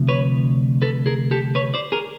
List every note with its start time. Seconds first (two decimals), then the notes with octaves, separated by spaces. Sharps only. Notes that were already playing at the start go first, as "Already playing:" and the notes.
Already playing: D2 C3 F3
0.09 B4 C#5
0.82 A4 B4
1.06 G#4 A#4
1.31 G4 A4
1.55 B4 C#5
1.74 C5 D5
1.92 G#4 A#4